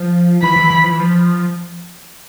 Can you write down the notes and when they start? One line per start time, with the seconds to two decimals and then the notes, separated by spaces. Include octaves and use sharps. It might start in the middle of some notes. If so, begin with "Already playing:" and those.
Already playing: F3
0.42 E3 B5
0.56 E3
0.70 E3
0.83 F3
0.91 E3
1.00 F3